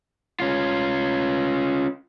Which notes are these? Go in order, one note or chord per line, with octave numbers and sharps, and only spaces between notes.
C#4 F4